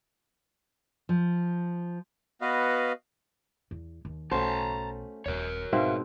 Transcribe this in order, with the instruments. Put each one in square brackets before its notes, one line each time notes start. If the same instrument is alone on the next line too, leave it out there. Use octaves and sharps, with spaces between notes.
[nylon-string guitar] F3
[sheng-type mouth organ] B3 F#4 B4 D#5 F5
[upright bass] E2
D#2
[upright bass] B1 [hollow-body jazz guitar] A3 C#4 F#4 [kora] C5 [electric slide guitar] A5 A#5
[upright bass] D#1 C4 [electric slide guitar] A#4 C#5
[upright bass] G#1 [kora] G#2 B2 C4 [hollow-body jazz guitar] E5 F5